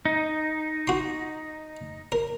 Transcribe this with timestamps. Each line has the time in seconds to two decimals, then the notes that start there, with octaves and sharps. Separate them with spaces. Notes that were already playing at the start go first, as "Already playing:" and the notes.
0.05 D#4
0.87 F#4 C6
2.12 A#4